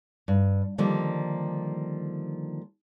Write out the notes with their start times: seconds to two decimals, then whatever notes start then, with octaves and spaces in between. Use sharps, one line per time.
0.28 G2
0.78 D3 D#3 F3 G3 A#3